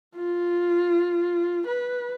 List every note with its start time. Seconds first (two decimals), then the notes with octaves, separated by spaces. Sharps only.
0.16 F4
1.67 B4